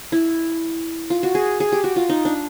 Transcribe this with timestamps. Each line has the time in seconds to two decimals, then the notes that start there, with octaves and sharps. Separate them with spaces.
0.12 E4
1.10 F4
1.23 F#4
1.35 G#4
1.60 G#4
1.72 G4
1.84 F#4
1.96 F4
2.09 D#4
2.25 D4